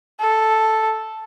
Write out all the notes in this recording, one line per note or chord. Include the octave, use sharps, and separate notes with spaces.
A4